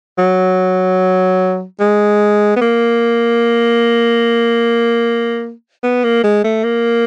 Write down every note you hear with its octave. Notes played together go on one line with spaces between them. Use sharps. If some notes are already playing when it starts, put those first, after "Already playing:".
F#3
G#3
B3
A#3
B3
A#3
G#3
A3
A#3